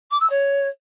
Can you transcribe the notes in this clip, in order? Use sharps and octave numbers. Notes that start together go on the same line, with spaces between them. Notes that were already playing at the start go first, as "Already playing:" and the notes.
D6
E6
C#5